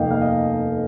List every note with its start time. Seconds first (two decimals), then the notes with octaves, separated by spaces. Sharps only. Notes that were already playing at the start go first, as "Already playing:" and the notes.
Already playing: F1 D#2 D#3 A#3 D#5 F5 G5
0.10 F5
0.21 D#5